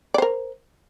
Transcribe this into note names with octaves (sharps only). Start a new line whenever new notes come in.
A#4 C5 D5